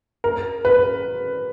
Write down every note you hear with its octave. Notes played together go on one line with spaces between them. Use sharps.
A#4
B4